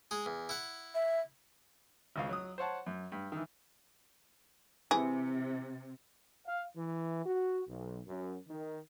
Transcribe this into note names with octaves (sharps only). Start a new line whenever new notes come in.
G#3 G#4
E2
E4 F#5
E5
G#1 C#2 F5
F#3 D#6
C5 C#5 F#5 A5
F#2
G2
D#3 E3
C3 E3 G#4
F5
E3
F#4
B1
F#2
D#3